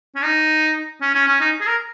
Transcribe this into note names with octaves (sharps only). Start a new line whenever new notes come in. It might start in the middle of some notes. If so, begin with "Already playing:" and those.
C#4
D#4
C#4
C#4
C#4
D#4
G#4
A#4